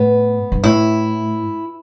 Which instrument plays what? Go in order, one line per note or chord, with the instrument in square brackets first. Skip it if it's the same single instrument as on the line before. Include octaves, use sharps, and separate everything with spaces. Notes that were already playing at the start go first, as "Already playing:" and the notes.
Already playing: [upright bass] A2 [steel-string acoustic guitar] B3
[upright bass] G2
[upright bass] A2 [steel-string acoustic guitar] E4